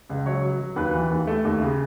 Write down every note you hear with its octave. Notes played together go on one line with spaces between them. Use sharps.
C#2
F#3 C#5
F#3
F#3
D#2 B4
E3
D#2
A3
D#2
C#3